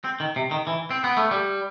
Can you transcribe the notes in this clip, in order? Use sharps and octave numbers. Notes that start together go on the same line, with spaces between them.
C4
D#3
C3
D#3
E3
C4
B3
A3
G3